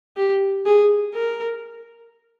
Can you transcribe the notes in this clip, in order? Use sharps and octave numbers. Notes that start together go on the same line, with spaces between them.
G4
G#4
A#4